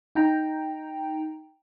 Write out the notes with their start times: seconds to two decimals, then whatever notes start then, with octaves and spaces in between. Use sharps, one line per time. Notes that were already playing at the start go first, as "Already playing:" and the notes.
0.15 D#4 G5 A#5